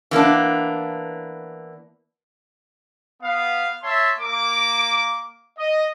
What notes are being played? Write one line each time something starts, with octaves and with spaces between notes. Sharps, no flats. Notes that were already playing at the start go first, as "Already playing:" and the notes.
E3 A#3 B3 D4
B3 F5
C#5 E5 A5 C6
A#3 D6
D#5